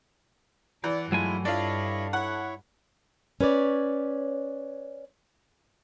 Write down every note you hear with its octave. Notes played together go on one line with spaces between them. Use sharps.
E3 D5 F#5
G2 F#3 G#3 A3 E4 F4 G#5
D4 E4 F4 A4 C#5 D#5
E4 C#5 F#5
C#4 B4 C#5 D5